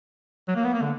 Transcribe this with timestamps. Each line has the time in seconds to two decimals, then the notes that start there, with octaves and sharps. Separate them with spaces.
0.48 F#3
0.56 A#3
0.64 B3
0.73 A#3
0.81 D3